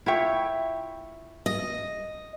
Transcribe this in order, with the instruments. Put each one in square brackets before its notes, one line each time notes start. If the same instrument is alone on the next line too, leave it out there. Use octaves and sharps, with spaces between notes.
[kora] E4 C#5 [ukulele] F4 E5 G5
[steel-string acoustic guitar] D#5